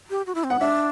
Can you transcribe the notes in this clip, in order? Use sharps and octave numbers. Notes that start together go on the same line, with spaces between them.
G4
F#4
E4
C4
B3 F#5
D4 E5